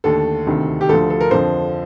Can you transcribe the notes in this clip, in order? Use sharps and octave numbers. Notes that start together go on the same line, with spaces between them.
D#2 D3 A3 A4
D2 C3 D#3
G4
D2 D3 F3 A4
A4
A#4
F2 D3 F3 C5